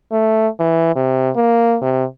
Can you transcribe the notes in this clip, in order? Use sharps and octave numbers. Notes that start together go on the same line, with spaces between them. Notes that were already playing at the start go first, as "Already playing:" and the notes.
A3
E3
C3
A#3
C3